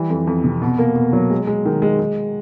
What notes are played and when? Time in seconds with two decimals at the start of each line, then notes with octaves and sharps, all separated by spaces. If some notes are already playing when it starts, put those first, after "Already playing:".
Already playing: E3 G3
0.10 F2
0.27 F2
0.44 C3
0.62 B2
0.78 A#3
0.96 B2
1.13 F#3
1.30 G#3
1.47 G#3
1.65 D#3
1.82 G#3
1.99 G#3